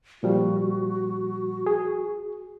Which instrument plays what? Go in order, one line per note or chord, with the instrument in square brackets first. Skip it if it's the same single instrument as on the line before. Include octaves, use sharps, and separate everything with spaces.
[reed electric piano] A#2 F3 G3 [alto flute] F#4
[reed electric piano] G#4